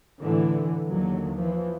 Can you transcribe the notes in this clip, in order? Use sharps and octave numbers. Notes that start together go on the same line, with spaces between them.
A2 D3 E3
D#2 D3 F#3
E3 F3